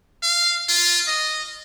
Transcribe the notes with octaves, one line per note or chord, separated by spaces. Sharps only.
F5
F4
D#5